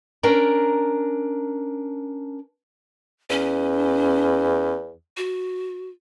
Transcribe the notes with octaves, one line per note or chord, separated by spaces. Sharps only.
C#4 D4 A#4 A#5
E2 C#4
F#4